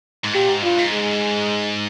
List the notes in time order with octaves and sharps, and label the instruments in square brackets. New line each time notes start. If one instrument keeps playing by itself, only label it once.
[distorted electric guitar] G#2
[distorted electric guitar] A#2 [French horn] G4
[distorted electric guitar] G#2
[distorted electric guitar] G2 [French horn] F4
[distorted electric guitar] G#2
[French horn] G#3